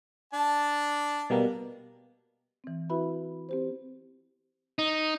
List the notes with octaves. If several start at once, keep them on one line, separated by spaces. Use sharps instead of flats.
D4 A5
B2 G3 A#3
E3 C4
E4 F#4 B4 E5 B5
C4 G4 C5
D#4